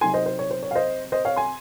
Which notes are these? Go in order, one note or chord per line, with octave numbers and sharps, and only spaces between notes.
C3 F#3 C4 D#4 G#5 C6
C5 D#5
C5
C#5
C5
C#5
F5
C5 D#5
C5 D#5
C#5 F5
G#5 C6